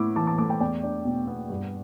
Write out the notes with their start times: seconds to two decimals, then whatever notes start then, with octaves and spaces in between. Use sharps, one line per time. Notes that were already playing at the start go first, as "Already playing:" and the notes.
Already playing: A2 B3 E4 D6
0.16 E3 A5 D6
0.27 A5 D6
0.38 A3 A5 D6
0.50 G5 B5
0.60 E2 D5 G5
0.83 D4
1.05 B2
1.27 B3
1.50 G2